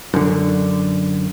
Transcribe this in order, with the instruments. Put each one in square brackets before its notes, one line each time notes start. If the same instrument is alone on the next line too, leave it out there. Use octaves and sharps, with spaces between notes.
[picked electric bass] F#2 D3